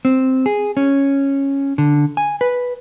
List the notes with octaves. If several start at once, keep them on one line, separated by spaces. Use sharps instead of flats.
C4
G#4
C#4
D3
G#5
B4